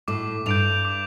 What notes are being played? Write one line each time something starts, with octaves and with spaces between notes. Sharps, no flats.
A2 D6
G2 G6 D7 F7
D6